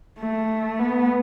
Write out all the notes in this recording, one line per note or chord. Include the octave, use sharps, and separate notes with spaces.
A3
B3